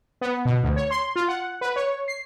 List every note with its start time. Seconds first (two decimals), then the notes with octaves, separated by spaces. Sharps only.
0.21 B3
0.45 B2
0.63 D2
0.76 C#5
0.91 C6
1.16 F4
1.28 F#5
1.61 B4
1.76 C#5
2.08 C7